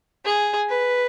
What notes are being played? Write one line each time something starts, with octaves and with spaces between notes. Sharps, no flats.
G#4
B4